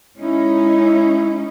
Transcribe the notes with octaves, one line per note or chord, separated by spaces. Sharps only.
G#3 C#4 D#4 E4